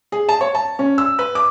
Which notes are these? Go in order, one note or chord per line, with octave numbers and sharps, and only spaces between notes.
G#4
A5
C#5
A5
C#4
E6
B4
D6